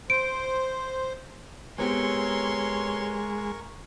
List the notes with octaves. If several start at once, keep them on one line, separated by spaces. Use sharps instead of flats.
C5 D7
G#3 B3 C4 G4 A#4 C#5 C6 C#6